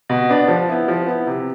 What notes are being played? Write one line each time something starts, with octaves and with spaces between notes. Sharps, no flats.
B2
B3 D4
F3
B3 E4
F3
B3 E4
C3